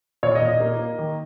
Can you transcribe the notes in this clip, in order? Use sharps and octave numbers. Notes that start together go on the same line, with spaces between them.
A#2 C#5
D#5
A#2
D#5
A#3
A#3
D#3